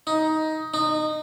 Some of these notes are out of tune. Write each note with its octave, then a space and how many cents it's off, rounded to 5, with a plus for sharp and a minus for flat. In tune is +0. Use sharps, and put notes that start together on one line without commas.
D#4 +15
D#4 -20